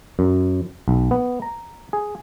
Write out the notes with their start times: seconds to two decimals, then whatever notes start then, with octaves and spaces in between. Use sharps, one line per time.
0.19 F#2
0.88 B1
1.11 B3
1.42 A#5
1.93 G#4